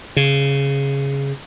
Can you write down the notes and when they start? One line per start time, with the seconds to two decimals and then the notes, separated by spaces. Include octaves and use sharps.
0.17 C#3